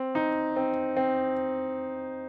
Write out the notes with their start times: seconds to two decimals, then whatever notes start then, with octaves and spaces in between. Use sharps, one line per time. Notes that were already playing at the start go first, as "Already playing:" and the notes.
Already playing: C4
0.15 D#4
0.56 C4
0.97 C4